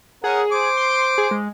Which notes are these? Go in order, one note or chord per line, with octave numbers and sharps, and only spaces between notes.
C#4 G#4 A#4 F#5
C5 D6
C6
G#4
G#3